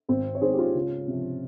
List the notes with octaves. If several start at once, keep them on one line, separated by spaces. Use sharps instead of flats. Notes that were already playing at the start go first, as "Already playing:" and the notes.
G#1 C4
C#5
G#2 D#3 G#4 C5
G4
C#4 F4
C#2
C3 F3